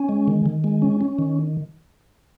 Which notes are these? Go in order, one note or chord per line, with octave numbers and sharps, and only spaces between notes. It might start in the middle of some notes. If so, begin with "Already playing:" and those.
Already playing: C#4
G#3
D#3
D#3
G#3
C#4
C#4
D#3